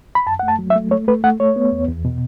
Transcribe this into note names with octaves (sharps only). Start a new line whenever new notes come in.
B5
F#2 A5
A3 F#5
A5
F#3
E5
A3
A3 C#5
A3 B4
A3 F#5
A3 C#5
B3
E2
E2
B2